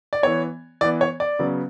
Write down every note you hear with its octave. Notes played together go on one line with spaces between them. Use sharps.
D5
E3 B3 C#5
E3 B3 D5
C#5
D5
C#3 F#3 B3